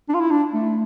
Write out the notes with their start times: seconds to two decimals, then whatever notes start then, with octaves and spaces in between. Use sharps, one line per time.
0.09 D4
0.14 F4
0.20 E4
0.31 D4
0.54 A3